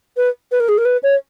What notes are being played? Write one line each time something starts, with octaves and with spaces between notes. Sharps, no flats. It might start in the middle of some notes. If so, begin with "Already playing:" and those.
B4
B4
A#4
G#4
A#4
B4
C#5